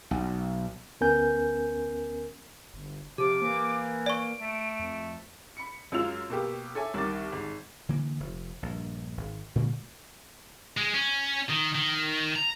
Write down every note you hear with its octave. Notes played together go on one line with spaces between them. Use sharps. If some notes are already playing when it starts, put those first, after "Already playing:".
B1
D2 B3 C#4 A#4 G#5 G6
G1
C3 F3 G4 D6
E3 A#3
D5 C#6 D7
A3
F2
B5 C#7
F#2 F#3 G#3 F4 E6 F7
B2 A#3 G4
A4 C#5 E5 G#5 D6
C2 D#3 A#4 C#6 D6 A6
G#1
D3 E3 A#3
F1
A#1 G2
G#1
A#2 D3 G#3 A#3
G#3
C#4
D#3
D#3
A#5